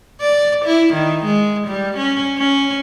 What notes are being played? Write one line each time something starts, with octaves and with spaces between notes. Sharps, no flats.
D5
E4
D#3
G#3
G3
C#4
C#4